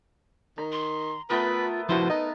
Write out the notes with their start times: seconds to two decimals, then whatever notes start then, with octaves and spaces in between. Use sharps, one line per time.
0.58 D#3 A#5
0.72 C6
1.30 A3 B3 F4 A#4 B4
1.89 F3 E4 F#4 B4 C5
2.10 D#4 D#5